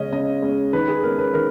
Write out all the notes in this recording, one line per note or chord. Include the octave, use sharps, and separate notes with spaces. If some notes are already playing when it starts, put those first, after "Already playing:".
Already playing: C#3 G#3 C#4 D#5
C#3 D#5
G#3 C#4
D#3 B4
G#4
G#3 C#4 A#4
B4
D#3 A#4